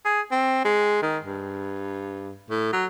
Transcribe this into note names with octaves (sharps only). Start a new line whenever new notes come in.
G#4
C4
G#3
D#3
G2
A2
F#3